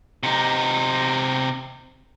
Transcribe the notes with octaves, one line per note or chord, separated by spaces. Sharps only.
C3 D#4